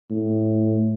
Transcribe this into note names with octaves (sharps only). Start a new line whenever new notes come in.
A2